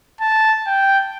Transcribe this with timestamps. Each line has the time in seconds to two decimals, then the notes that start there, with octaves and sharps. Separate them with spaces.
0.20 A5
0.67 G5